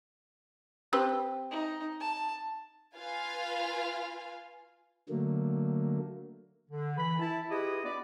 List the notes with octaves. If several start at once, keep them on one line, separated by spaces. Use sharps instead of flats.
C4 G4 B4
D#4
A5
F4 B4 F5 G#5
D3 F#3 A3 A#3
D3
E3 B5
E4 A5
E4 F4 G4 G#4 B4 D#5
B3 D4 D5